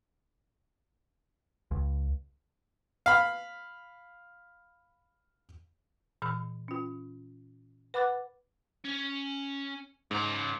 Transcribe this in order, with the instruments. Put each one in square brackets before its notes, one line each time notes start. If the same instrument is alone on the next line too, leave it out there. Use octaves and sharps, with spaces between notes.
[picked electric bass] C#2
[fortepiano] F5 B5
[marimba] A#2 E3 B5 E6
C#4 F4
B4 F#5 B5 D6 F#6 A6
[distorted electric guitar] C#4
[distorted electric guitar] C#2 A#5 [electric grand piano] G#2